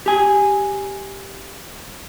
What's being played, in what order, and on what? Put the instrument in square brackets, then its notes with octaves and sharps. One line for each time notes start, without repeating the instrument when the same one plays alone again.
[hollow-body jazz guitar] G4 G#5